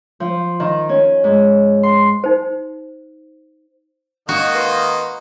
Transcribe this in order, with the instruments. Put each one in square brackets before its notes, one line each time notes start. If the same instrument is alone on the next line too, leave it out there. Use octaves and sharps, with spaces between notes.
[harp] F3
D#3
C#4
G#2
C6
[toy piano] D#4 C5
[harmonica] D#3 A#3 D#4 [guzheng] F#4
[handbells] B4 F5 C6